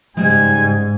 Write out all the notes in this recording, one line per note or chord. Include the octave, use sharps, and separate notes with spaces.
G#2 C#3 G3 G#3 G#5